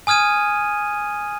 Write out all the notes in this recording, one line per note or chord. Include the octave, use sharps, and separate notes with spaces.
G#5 D#6 F6 G#6 D#7